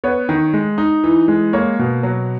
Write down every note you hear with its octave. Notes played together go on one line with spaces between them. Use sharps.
B3 C#5
D#3
G#3
D#4
E3
G#3
A#3 C#5
B2
F#3